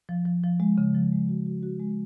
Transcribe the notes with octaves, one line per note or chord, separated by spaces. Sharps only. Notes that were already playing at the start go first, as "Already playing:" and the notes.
F3
F3
F3
G#3
C#3
F3
G#3
F#4
F#4
F#4
G#3